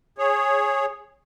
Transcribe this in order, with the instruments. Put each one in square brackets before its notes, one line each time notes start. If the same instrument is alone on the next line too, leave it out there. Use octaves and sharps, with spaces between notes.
[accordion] G#4 C#5